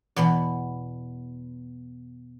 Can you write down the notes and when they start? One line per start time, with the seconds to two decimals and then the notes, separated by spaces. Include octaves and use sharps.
0.16 E2 B2 B3